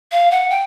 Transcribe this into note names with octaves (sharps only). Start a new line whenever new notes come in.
F5
F#5
G5